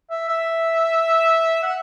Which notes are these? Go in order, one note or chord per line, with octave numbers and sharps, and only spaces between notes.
E5
E5
F#5